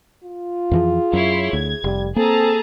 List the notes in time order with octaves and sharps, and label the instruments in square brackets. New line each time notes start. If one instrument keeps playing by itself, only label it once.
[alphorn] F4
[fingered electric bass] F2 E3 F3 [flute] G#4
[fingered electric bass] F#2 [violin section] E4 C#5 C6
[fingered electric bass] D2 [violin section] G#6
[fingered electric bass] F1 [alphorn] G3
[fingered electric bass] A#3 [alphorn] C4 [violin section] G#4 A5 A#5 [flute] A4